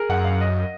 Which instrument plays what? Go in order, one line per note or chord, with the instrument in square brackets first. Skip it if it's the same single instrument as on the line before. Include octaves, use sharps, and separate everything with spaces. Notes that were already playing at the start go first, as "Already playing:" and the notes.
Already playing: [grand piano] G#4 A#4
[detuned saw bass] F#2 [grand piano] F#5
[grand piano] F5
D#5